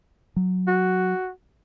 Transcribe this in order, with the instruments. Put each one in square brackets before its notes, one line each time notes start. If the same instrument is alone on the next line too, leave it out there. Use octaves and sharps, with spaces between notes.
[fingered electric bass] F#3
[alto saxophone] F#4